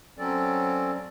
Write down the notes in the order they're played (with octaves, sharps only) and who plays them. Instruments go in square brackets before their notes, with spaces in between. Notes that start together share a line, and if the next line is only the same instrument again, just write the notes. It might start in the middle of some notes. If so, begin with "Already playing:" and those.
[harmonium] F#3 C4 C#4 A4 D5